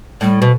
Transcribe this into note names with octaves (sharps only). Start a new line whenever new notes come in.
A2 G3
B2